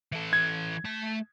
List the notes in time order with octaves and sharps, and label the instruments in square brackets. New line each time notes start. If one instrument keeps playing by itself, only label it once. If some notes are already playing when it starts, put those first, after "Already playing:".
[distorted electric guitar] E3 A4
[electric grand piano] G#6
[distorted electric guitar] A3 A5